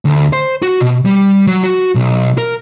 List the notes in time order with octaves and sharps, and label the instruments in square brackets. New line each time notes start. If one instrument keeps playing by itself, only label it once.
[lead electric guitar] D2
C5
F#4
B2
G3
F#3
F#4
B1
A#4